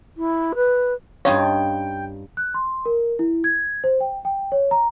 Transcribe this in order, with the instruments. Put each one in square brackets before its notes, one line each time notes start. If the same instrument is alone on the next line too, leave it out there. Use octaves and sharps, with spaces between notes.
[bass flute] E4
B4
[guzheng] G2 D#4 F4 [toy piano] C#4 F5 [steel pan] C#5 [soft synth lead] G5
[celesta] F#6
C6
A#4
E4
G#6
C5
G5
G5
C#5
A#5